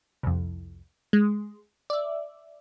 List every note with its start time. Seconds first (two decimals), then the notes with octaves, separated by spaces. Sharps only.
0.23 C2 F2
1.13 G#3
1.90 D5 E5